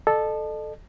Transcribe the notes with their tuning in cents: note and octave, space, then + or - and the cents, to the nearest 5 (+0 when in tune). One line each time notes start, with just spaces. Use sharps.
A4 -10 D#5 -45